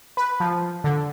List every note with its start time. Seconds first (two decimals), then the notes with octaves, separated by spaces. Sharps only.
0.17 B4
0.40 F3
0.84 D3